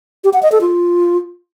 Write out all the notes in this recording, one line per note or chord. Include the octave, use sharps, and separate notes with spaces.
G4
F#5
D#5
A4
F4